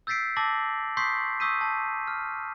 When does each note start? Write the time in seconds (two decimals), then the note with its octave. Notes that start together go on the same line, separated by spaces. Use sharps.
0.07 E6 G6 A6 B6 C7 D7
0.36 A5 D6 E6 A6 A#6 F#7
0.97 C6 C#6 D#6 G6 B6 C7
1.40 C#6 D#6 E6 G6 B6 D#7
1.61 A5
2.07 F6